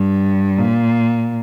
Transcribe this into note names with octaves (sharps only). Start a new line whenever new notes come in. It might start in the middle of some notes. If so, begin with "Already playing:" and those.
Already playing: G2
A#2